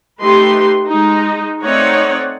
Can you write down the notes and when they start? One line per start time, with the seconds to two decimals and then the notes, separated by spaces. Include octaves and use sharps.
0.22 A3 D#4 G4 B4 C6
0.88 G#3 D#4
1.62 A3 C4 D#4 C#5 D5 F#5